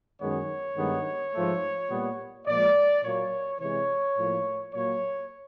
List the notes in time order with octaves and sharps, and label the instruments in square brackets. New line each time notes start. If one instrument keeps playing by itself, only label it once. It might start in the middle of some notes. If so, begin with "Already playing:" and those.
[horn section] F#2 D#3 G#3 B3 C#5
G2 D#3 G#3 B3
G#2 F3 A3
A#2 G3 B3
A#2 F3 G#3 D5
A#2 F#3 A#3 C#5
C3 E3 G#3 C#5
A2 F3 A#3
A#2 F#3 A#3 C#5